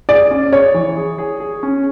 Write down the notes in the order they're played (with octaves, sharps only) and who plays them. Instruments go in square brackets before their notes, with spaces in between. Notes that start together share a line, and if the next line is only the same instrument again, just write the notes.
[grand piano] G#4 [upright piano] D5
[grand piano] C#4
[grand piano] G#4 [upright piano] C#5
[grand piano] E3
G#4
G#4
G#4
C#4